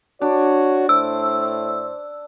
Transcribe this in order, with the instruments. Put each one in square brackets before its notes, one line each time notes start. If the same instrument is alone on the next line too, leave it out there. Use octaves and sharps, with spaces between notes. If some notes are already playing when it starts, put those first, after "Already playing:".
[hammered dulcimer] D4 [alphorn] F#4 [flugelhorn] C#5
[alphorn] A2 [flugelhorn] C5 [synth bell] E6